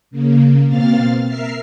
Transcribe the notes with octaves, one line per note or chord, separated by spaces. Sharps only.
C#3 A#3
B2 A#3 C4 F5 F6 A6
A#4 E5 F6 C7